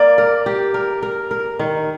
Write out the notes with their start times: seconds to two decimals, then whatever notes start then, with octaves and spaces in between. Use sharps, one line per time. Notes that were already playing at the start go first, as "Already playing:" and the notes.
Already playing: A#3 D5
0.18 A#4
0.46 G4
0.74 A#4
1.03 A#4
1.31 A#4
1.59 D#3